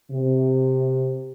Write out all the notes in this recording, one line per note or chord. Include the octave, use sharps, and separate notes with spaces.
C3